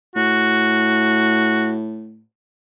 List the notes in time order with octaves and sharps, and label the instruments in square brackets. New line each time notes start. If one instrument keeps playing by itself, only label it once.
[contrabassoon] A2 [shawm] F#4